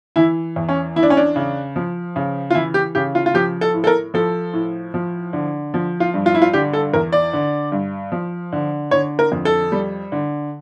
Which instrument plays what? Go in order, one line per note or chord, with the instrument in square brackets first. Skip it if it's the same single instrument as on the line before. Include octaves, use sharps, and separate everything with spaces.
[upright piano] E3 E4
E2
C#4
E3 E4
D4
C#4
D4
C#3
F3
C#3
F4
E3 E4
G4
C#3 G4
F4
F4
F3 G4
A4
A2
A4
A#4
F3 A4
A2
F3
D3
F3
F4
G2
F4
E4
F4
D3 G4
A4
E2 A#4
D5
D3
G2
F3
D3
D3 C#5
A#4
F2
A4
G3
D3